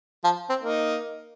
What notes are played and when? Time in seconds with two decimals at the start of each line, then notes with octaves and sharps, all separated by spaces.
0.24 F3
0.49 C4
0.62 A#3 D#4